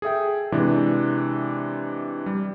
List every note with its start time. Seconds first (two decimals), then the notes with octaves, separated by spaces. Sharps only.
0.02 G#4 A4 E5 G5
0.52 C3 E3 G#3 D4
2.26 G3